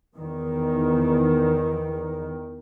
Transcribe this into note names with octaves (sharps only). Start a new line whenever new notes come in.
E2 D#3